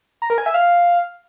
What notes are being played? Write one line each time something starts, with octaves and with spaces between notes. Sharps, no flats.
A#5
A#4
G#5
E5
F5